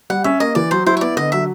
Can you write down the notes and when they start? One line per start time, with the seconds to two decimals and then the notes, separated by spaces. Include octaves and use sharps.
0.10 G3 F#5
0.24 C#4 E5
0.40 A#3 D#5
0.55 E3 D5
0.71 F#3 C5
0.86 E4 C5
0.97 C#5
1.01 B3 D5
1.16 D3 D#5
1.32 F#3 E5